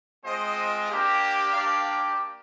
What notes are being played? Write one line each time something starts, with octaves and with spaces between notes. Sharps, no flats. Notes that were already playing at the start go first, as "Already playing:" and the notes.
G#3 C4 F4 C5 D#5
A#3 D4 G4
A#3 D4 G4 D5 F5